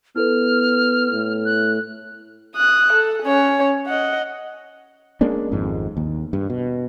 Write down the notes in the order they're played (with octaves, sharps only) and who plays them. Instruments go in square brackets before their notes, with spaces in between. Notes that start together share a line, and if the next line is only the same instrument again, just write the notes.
[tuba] B3 [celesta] E4 A4 B4 [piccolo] F6
[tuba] A2
[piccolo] F#6
[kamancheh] D#6 F#6
A4
C#4 C#5
D#5 F#5
[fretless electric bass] G#3 A#3 C#4 D4
G#1 F2 G#2
D#2
G2
B2